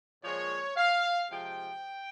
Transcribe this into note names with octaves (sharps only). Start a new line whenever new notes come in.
A#2 F3 G#3 C#5
F5
C3 F3 G#3 G5